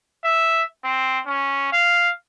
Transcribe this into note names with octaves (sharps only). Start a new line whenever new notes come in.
E5
C4
C#4
F5